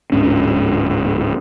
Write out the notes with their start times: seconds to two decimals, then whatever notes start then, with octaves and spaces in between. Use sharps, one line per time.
0.12 D1 G#2 C#4 D4